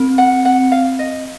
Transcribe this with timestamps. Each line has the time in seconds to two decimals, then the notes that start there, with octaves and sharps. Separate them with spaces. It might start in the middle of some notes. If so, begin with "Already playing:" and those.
Already playing: C4
0.18 F#5
0.45 F#5
0.72 F5
0.99 D#5